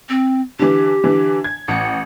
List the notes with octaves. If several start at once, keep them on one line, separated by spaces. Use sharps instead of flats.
C4
D3 E3 G4
D3 E3
G#6
A1 F#5 C#7